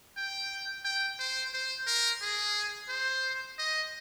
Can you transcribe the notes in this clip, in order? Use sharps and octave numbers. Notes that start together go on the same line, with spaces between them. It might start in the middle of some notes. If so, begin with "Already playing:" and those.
G5
G5
C5
C5
A#4
G#4
C5
D#5